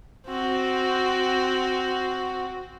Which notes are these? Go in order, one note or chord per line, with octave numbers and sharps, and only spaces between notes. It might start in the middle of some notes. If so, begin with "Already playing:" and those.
C4 F#4